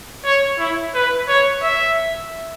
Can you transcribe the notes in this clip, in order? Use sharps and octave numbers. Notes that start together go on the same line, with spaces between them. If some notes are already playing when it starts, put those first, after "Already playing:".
C#5
E4
B4
C#5
E5